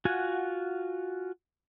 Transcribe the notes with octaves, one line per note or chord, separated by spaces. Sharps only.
F4 F#4 F#5 G#5